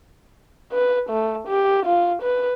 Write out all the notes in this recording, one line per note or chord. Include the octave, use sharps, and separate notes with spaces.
B4
A3
G4
F4
B4